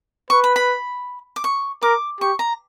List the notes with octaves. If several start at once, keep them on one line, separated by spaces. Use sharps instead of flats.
B4 C#6
B5
B5
D6
C#6
A#4 D6
G4 C#6
A#5